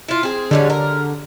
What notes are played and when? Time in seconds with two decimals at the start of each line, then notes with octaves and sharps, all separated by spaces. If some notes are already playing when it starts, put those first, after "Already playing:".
0.08 E4 F4
0.23 C4 G#4
0.51 D3 G3 G#3 C#4
0.70 A#4